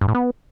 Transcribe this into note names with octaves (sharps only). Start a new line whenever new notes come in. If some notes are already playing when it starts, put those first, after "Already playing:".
G2
A2
B3